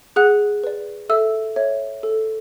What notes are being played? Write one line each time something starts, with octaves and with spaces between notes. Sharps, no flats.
G#4 F#5 F#6
B4 D5
A4 E5 E6
C#5 E5
A4